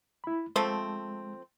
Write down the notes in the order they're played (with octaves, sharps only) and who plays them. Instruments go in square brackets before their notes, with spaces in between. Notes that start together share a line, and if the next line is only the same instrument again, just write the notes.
[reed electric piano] E4 B5
[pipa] F3 A3 C4 [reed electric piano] G#3